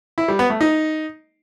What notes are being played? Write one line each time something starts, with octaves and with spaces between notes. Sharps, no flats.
E4
G3
B3
A3
D#4